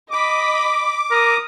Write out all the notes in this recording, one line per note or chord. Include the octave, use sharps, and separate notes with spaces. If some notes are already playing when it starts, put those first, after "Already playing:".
D#5 B5 D6
A#4 D#6